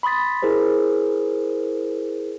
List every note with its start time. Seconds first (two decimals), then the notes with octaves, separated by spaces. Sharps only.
0.03 B5 C6 D#6 A6 B6
0.42 E4 G#4 A#4 C5